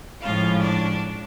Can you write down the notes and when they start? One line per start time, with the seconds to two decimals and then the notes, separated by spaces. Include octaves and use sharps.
0.21 A2 F3 G#3 C#4 F4 F5
0.60 D4 D5